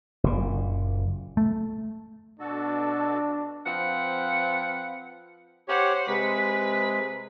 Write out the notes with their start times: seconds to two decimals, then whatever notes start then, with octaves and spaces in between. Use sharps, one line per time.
0.24 F#1 A#2
1.37 A3
2.40 B2 D4 F#4 A4
3.65 F3 C4 B4 F5 F#5
5.68 G4 C5 C#5 F#5
6.08 C3 G#3 B4 B6